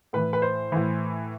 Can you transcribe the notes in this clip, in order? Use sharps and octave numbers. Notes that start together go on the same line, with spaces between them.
A2 E3 B4
B4
C5
A2 E3